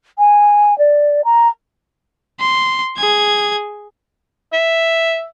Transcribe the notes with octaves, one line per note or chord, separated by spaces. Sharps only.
G#5
D5
A#5
C6
G#4 G#6
E5